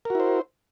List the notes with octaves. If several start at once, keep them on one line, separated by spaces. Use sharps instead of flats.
E4 F#4 A#4 C5